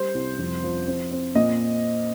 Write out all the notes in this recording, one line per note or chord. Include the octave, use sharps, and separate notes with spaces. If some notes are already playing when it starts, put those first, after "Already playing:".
Already playing: G3 C5
C2
F2
F3
C4
C4
A#2 D#5